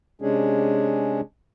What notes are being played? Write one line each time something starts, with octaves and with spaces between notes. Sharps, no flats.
C3 G#3 C#4 D4 G#4